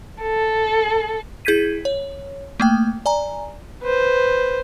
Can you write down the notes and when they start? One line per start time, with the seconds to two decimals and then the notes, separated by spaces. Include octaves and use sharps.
0.23 A4
1.45 E4 G#4 G6 G#6 B6 D#7
1.85 C#5
2.60 A3 A#3 G5
3.06 D5 G#5 A#5
3.82 B4 C5